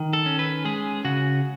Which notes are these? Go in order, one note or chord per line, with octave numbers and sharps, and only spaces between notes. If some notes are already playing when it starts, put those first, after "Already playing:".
Already playing: D#3
A4
C#4
B4
G#3 G#4
C#3 F#4